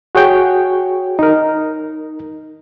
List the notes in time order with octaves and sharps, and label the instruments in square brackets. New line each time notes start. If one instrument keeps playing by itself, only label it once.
[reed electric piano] F#4 G#4 C#5 G5
D#4 A#4